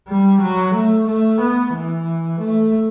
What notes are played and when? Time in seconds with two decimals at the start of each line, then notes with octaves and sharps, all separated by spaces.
0.08 G3
0.41 F#3
0.74 A3
1.07 A3
1.41 B3
1.74 E3
2.40 A3